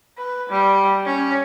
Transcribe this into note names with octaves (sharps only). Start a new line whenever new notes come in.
B4
G3
C#4